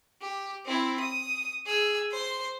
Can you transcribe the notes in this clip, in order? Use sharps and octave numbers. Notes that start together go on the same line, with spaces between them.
G4
C4 E4
D#6
G#4 E6
C5 C6